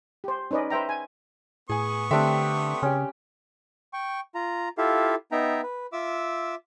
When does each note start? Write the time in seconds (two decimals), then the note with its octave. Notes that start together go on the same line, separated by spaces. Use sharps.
0.24 G4 C5
0.51 C#4 D#4 B4 D5 D#5
0.70 B4 C5 E5 G5 A#5
0.89 G#5
1.70 A2 B3 G#4 G#5 C#6 D#6
2.11 D3 A3 C4 D4 G4 E5
2.83 C#3 C#4 G4
3.93 G5 C#6
4.35 F4 A#5
4.78 E4 F4 G4 A4 E5 F5
5.32 B3 D#4 E5 G5 A#5
5.63 B4
5.93 F4 E5 D6 E6